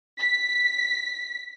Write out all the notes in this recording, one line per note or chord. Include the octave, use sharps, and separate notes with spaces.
B6